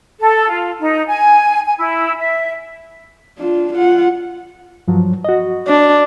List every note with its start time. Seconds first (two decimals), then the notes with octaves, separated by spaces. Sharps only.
0.20 A4
0.49 F4
0.81 D#4
1.07 G#5
1.65 G#5
1.78 E4
2.19 E5
3.39 D4 F4
3.73 F4 F#5
4.88 G2 F3 F#3
5.25 F#4 D#5
5.68 D4